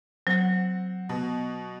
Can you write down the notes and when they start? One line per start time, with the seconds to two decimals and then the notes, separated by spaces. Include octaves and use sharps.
0.27 F#3 C4 F#5
1.09 B2 B3